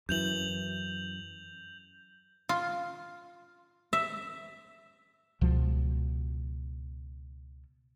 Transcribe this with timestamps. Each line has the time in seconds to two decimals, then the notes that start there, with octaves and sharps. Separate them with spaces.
0.09 F#2 E3 G6 F7 F#7
2.49 F4
3.93 E5
5.41 C#2 B2 F3